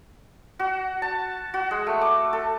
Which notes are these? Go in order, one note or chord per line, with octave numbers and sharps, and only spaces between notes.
F#4
A5
F#4
G#3
A3
D6
A4